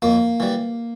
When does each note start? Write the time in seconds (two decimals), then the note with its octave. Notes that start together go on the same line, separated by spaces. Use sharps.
0.02 F2 A#3
0.40 E3 G3